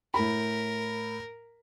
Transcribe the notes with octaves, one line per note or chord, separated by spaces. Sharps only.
A2 A#4 B5